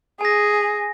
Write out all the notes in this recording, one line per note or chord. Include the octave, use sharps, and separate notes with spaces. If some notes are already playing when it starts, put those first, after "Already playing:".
G#4 G#5 A#6